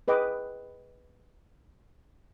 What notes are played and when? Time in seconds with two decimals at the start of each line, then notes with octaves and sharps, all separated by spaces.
0.08 G#4 B4 D#5 G5 D6